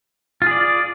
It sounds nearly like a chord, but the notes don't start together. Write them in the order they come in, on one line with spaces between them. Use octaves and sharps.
F4 G#4 D5